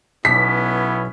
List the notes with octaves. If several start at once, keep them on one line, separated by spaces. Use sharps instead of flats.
B1 B3 C#4 E4 B6